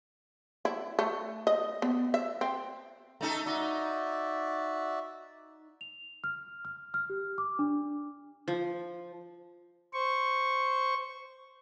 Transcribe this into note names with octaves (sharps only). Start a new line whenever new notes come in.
E4
A3
D#5
B3
E5
C4
A3 D#4 A4 A#5
D#4 F#4 D5 E5
F7
F6
F6
F6
G4
D6
D4
F3
C5 C#6